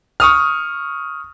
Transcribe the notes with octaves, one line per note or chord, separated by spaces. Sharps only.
C#6 D#6 F6